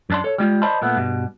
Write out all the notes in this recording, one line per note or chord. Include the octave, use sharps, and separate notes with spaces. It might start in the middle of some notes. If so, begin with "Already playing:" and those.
F#2 D4 C6
A4 C#5
G3 G#3 F4
C5 D5 D#5 A5 B5 C6
A#2 A3 B3
G2 B2